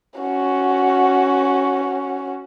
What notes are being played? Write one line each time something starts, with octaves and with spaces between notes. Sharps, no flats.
C#4 F#4